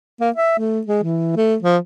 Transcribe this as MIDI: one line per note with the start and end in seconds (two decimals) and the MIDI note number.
0.21 0.30 58
0.36 0.56 76
0.59 0.80 57
0.87 1.01 56
1.03 1.33 52
1.36 1.56 57
1.63 1.77 53